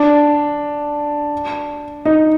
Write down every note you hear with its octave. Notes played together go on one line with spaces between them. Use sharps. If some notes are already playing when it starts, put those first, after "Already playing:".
Already playing: D4
D#4